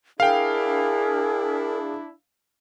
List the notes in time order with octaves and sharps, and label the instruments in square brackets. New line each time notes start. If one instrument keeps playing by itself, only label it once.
[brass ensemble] D4 E4 [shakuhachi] G#4 [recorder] A#4 [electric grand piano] F5 G5